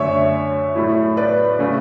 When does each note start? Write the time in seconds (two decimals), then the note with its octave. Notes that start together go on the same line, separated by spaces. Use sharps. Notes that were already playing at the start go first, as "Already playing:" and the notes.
Already playing: F#2 D3 A3 C#5 E5
0.75 A2 F#3 A3 E4
1.17 B4 D5
1.59 C#3 F#3 A3 C#4